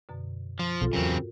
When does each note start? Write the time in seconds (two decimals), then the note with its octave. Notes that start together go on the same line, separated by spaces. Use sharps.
0.09 F#2 B2 D3
0.59 F3
0.81 B1 G#2 B2 F4 A4
0.93 E2 C#3 F#3 C4 F#4 A#4